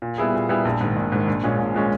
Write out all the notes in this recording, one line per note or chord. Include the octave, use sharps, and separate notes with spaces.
A#2
G3 B3 E4 G#4
A#2
G3 B3 E4 G#4
A#1
G#2 D#3
A#1
G#2 D#3
A#1
A#2 G#3 C#4
A#1
A#2 G#3 C#4